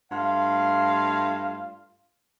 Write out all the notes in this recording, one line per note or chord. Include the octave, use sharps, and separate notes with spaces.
G2 A3 F4 F5